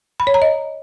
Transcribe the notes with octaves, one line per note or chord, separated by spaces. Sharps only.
B5
C#5
A#5
D#5